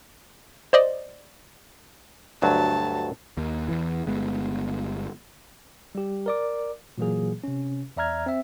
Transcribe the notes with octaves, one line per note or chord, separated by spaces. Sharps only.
C5 D5 D#5
D2 G2 F#3 A5
D#2
E2 E3
G1 G#3 B3
G3 G4
A#4 D5 D6
A#2 E3 F#3 A#3 G#4
C3 C#4
E2 D5 E5 A#5 F6 G#6
C4 E5